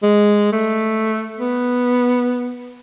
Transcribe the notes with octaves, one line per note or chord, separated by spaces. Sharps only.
G#3
A3
B3